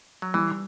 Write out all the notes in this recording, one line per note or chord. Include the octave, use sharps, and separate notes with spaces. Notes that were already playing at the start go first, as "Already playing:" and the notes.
F#3
E3 G3